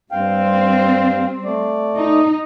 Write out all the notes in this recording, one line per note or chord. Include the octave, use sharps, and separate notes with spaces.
G2 G3 C4 F5 G5
A3 D5
D#4